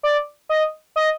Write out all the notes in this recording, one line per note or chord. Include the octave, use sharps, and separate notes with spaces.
D5
D#5
D#5